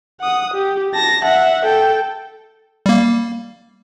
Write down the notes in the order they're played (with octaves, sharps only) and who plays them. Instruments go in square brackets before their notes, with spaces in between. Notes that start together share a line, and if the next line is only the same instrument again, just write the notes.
[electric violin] F#5 D#6
G4
A5 A#6
E5 F#5
A4 G5
[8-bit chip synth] G3 A#3